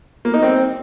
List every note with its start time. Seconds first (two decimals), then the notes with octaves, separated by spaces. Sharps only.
0.25 A#3
0.34 D#4
0.43 C4